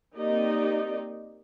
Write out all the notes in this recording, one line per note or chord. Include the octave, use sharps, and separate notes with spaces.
A#3 C4 D#4 G4 D5 D#5